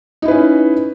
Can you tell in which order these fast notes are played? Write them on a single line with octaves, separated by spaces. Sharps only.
D#4 E4 B4 C#4